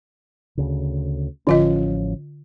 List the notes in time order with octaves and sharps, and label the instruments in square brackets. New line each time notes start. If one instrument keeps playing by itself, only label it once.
[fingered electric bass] D2 C#3
[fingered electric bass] A1 F3 C#4 [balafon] D3 F4 D#5